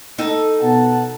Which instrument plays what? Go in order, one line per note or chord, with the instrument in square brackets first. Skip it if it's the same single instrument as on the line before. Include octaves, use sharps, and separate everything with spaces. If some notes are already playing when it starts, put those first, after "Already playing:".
[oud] D#4 A4
[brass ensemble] B2 F#5 A5